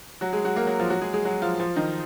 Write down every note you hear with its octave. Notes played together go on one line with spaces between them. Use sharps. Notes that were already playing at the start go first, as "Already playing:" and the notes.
F#3 F#4
G#3 G#4
F#3 F#4
A#3 A#4
F#3 F#4
F3 F4
F#3 F#4
G#3 G#4
G#3 G#4
F#3 F#4
F3 F4
F3 F4
D#3 D#4